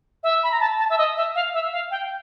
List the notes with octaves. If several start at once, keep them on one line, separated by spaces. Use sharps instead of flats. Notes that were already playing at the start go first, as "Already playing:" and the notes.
E5
B5
A#5
A5
A5
E5
D#5
E5
F5
E5
F5
G5